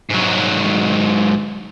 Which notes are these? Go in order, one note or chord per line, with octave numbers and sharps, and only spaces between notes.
G#2 F#3